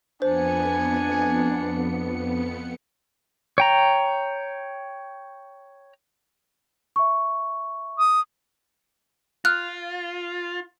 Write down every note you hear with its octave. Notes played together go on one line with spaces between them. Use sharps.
F2 B3 D4 C5 G#5 C#7
C#5 G5 A#5
E5 C#6
D#6
F4 F6 F#6